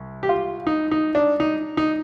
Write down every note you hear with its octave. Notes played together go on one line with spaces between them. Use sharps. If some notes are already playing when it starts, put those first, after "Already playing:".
Already playing: C2
G4
F4
D#4
D#4
D4
D#4
D#4